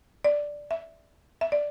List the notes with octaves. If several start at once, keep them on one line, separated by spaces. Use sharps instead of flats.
D5
E5
E5
D5